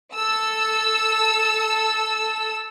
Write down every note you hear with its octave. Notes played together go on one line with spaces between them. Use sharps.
A4 E6